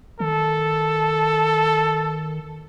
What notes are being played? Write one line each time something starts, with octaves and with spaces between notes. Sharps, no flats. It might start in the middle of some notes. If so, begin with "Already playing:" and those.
D#3 A4